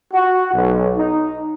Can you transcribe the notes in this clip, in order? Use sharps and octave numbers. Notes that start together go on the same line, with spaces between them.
F#4
B1
D#4